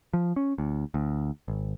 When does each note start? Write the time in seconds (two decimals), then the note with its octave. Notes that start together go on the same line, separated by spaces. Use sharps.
0.14 F3
0.36 C#4
0.58 D2
0.94 D2
1.48 G#1